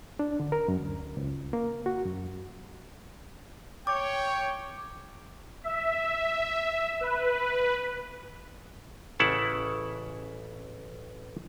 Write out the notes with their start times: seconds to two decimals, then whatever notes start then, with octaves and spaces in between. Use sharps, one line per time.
0.19 D4
0.40 D3
0.52 A#4
0.68 F#2
0.81 D2
1.17 C#2
1.53 A#3
1.86 F#4
2.05 F#2
3.87 C#5 G5 D6
5.64 E5
7.01 B4
9.19 A1 C#3 E4 F#5 A5